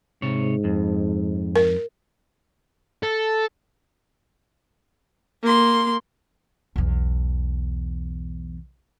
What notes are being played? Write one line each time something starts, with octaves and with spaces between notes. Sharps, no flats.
G#2 C3 C#5
F2
A#4
A4
A#3 C6
B1 E2